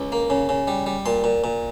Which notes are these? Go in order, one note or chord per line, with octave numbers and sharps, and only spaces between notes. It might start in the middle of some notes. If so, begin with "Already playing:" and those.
Already playing: C#2
A#3
C#3
C#3
G3
G3
A#2 C6
A#2
A#2